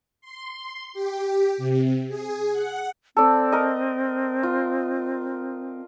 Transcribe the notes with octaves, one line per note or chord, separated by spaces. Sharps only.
C6
G4
C3
G#4
F#5
C4 A4 D5
A#4 D#5
F4